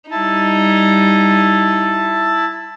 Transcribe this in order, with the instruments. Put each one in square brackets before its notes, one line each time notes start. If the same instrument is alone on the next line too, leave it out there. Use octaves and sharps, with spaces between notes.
[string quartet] G3 D#4 [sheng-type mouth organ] E4 A5